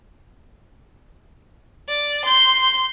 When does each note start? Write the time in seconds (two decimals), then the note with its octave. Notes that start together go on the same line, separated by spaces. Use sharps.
1.89 D5
2.25 C6 G6